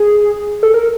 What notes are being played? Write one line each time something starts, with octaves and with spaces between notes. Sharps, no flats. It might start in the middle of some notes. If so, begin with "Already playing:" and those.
Already playing: G#4
A4
A#4